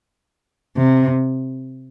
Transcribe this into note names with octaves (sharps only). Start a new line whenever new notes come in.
C3